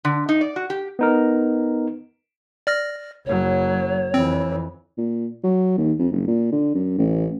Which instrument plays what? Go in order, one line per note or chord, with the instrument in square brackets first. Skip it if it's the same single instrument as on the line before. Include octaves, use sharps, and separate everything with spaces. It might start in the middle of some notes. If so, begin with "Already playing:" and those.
[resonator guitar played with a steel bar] D3
D#4
D5
F#4
G4
[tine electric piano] B3 D#4 A#4
[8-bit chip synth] D5 F6 A#6
[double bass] F#1 F#3 [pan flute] C#5
[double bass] F2 E3 [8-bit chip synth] C4
[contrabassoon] A#2
F#3
D#2
F2
F#1
A#2
D3
F#2
A1